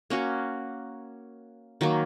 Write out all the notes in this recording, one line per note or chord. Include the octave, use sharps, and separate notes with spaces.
A#3 C#4 F#4
D#3 F#3 A#3